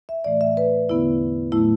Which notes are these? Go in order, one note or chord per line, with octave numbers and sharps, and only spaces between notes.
E5
A2 E3 A3 D5
E5
B4
E2 D3 B3 E4
A2 F#3 A3 E4